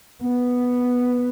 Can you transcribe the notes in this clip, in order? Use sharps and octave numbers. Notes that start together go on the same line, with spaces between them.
B3